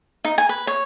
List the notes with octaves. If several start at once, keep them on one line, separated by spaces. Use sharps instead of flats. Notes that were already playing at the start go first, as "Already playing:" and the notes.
D#4
G#5
B4
C#5